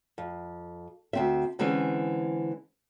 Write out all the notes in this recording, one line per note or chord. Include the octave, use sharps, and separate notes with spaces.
F2
D2 C4 E5
D3 E3 G#3 C4 C#4